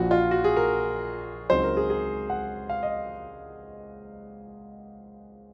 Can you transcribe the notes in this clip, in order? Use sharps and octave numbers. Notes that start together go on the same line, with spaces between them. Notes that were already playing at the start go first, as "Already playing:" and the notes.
Already playing: A#1 A#2 F3 F#4
F4
F#4
G#4
A#4
C#2 C#3 F#3 C4 D#4 C5
A#4
G#4
G#4
F#5
F5
D#5